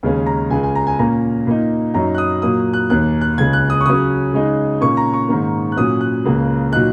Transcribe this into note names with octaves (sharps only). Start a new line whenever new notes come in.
D#2 C#3 G#3 C#4
A#5
C#2 C#3 G#3 G#5
G#5
A#5
G#5
A#2 A#3 C#4 A#5
A#2 A#3 D#4
F#2 F#3 D#4 A#5
F#6
D#6
A#2 F#3 A#3 D#6
F#6
D#2 D#3 A#3 F#6
F#6
C#2 C#3 G#3 G#6
F#6
D#6
C#6
C#3 F#3 C#4 D#6
C#3 G#3 D#4
A#2 A#3 C#4 C#6
A#5
C#6
G#2 D#3 A#3
F#6
A#2 F#3 C#4 D#6
F#6
C#2 C#3 A#3
A#2 F#3 D#4 F#6